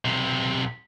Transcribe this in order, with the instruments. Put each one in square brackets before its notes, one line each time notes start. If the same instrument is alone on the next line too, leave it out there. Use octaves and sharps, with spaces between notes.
[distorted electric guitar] B1 C3